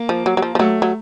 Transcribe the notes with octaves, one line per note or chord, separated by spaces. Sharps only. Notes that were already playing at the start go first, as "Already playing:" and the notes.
Already playing: A#3
F3
F#3
F#3
F3
F3
F#3 A3
F#3